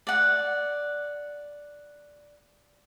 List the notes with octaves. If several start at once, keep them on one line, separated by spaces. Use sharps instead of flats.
D5 F#5